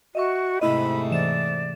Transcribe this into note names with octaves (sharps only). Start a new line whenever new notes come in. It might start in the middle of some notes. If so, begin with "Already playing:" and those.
F#4 D#5 E5 C#6
G#2 C3 A3 E4 D#5 B5
E3 D5 E7